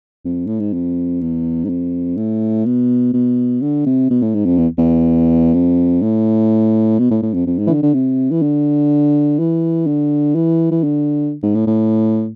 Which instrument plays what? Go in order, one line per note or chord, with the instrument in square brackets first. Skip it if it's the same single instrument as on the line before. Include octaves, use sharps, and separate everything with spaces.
[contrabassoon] F2
A2
G#2
F2
E2
G#2
F2
A2
B2
B2
D3
C3
B2
A2
G#2
F2
E2
E2
F2
A2
B2
A2
A2
F2
F2
G#2
E3
D3
D3
C3
E3
D3
E3
D3
E3
E3
D3
G#2
A2
A2